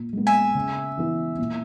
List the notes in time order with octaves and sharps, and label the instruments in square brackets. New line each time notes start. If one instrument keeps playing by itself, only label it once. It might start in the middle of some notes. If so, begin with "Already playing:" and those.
Already playing: [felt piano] A#2
G#3 B3
[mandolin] E5 G#5
[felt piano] C#3
E3 B3 E4
A#2